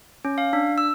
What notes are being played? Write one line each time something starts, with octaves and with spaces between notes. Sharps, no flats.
C#4
F5
D4
E6